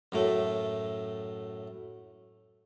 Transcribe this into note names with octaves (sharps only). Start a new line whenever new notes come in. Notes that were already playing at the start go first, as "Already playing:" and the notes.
F#2 A2 A3